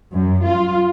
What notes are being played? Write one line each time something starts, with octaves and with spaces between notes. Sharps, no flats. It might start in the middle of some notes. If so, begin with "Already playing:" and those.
F#2
F4